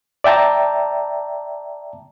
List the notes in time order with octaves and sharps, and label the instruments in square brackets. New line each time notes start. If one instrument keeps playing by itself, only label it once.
[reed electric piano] D5 E5 G5 A5 A#5